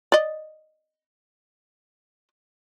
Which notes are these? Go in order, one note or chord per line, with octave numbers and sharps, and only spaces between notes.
D5 D#5